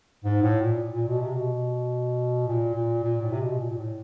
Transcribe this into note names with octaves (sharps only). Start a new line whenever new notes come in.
G#2
A2
A#2
A#2
B2
C3
B2
A#2
A#2
A#2
A2
C3
B2
A#2
A#2
A2